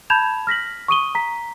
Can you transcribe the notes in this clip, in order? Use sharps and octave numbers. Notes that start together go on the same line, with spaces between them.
A5 B5 G6 G#6 E7 F7
F6 A#6 B6 F#7
C#6 D#6 D#7 G7
A#5 B6